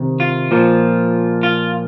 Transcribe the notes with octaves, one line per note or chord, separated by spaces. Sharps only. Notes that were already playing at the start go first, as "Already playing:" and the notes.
Already playing: C3 D#3
F4
A#2 F3
F4